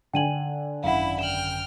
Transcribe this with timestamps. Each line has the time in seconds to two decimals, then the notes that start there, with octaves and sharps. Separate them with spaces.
0.14 D3 G5 G#5 D#7 F#7
0.84 G#1 F#2 E4 F5 F#5 B5
1.19 G5 F6 E7 F#7